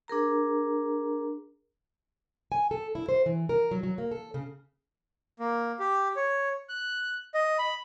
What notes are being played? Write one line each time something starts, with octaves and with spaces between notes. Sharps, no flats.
D4 G#4 A#4 A#5
G#5
A4
E4
C5
E3
A#4
F#3
F#3
A#3
A4
C#3
A#3
G4
C#5
F#6
D#5
B5